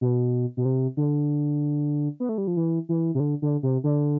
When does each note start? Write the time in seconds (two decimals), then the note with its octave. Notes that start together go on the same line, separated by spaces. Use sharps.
0.01 B2
0.57 B2
0.65 C3
0.97 D3
2.20 B3
2.29 A3
2.38 G3
2.47 F3
2.57 E3
2.89 E3
3.15 C3
3.20 D3
3.42 D3
3.63 C3
3.84 D3